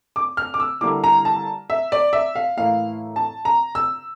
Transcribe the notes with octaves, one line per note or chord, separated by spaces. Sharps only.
D6
F6
D6
E6
D3 G3 A#3 E4 D6
A#5
A5
E5
D5
E5
F5
A2 E3 A#3 E4 F5
A5
A#5
E6